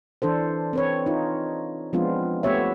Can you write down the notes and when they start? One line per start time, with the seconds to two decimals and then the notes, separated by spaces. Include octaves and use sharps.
0.22 E3 D4 A4 C5
0.73 C4 B4 C#5
1.06 D#4 F4
1.93 F3 G#3 B3 C4 D4 F4
2.43 A3 B3 G4 C#5 E5